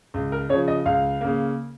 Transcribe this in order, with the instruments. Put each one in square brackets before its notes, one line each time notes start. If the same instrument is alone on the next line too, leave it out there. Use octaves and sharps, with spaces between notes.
[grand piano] C#2
A#4
C#3 C#5
F3
D#5
C#2 F5
C#3 A#3